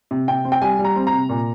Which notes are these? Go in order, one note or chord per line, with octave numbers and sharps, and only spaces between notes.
C3
C3 G5
C4
G5
G3 G#5
G3
A#5
C4
A#5
C3
A#2